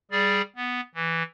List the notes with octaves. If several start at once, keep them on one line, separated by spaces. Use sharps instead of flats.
G3 G#4 D5
B3
E3